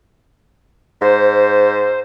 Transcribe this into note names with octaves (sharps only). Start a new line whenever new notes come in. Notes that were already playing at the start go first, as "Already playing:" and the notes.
G#2 C5